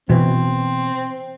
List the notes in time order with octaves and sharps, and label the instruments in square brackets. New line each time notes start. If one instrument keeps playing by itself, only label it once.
[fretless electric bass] B2 E3 [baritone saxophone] C4